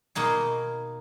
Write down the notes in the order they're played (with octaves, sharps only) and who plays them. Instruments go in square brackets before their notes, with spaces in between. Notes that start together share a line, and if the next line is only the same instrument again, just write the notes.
[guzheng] B2 A#3 D#4 G#4